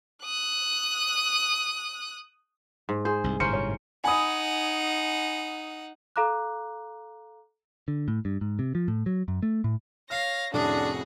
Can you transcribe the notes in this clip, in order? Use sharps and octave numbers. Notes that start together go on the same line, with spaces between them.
D#6 F#6
G#2
G#4 C5
C2
G1 A2 C3 C#4 A#4 C5 C#7
C#5
D#4 F#5 G#5 B5 D#6
A4 F5 A#5 D6 F#6
D3
A2
G2
G#2
C3
F3
A2
F#3
F#2
A3
A2
C#5 F5 F6 A#6 C7
C2 F2 A2 C#4 D4 F#4 G#4